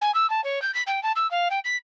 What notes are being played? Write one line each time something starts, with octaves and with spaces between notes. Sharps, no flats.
G#5
E6
A5
C#5
G6
B6
G5
A5
E6
F5
G5
B6